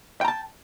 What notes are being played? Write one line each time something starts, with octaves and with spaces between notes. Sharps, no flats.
G5 A5 A#5